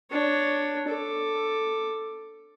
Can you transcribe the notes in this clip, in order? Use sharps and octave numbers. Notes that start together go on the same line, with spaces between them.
D4 C#5
A4 D6